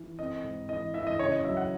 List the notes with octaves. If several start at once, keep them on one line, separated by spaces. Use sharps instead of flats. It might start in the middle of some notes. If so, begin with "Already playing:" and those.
Already playing: E3
C4 D#5
G#2
E3 D#5
E3 E5
D#5
C#3 C#5
D#5
F#3 E5
F#5